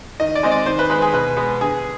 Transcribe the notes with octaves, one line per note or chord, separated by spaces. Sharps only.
D#3 D#5
D5
G#3 C4 D#5
D5
D#3 C5
B4
G#3 B3 B4
G#4
B2 B4
G#3 B3
D3 G#4